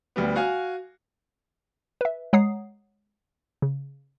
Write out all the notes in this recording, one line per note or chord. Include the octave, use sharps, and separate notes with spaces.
D2 G3 B3
F#4 F5 G#5
B4 E5
G#3 C#5 F#5 A#5 D#6 C7
C#3